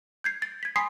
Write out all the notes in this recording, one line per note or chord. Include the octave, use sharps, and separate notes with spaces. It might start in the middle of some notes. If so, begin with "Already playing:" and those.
G6 G#6 C7
A6
G#6 B6
G#5 B5 C6 D#6 B6 C7